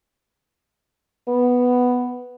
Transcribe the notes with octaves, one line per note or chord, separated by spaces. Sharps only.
B3